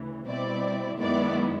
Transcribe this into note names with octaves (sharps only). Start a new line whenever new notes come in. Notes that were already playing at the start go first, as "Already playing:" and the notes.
Already playing: D2 C#3 E3
B2 G3 C4 E4 D5
F#2 D#3 G#3 B3 E4 D5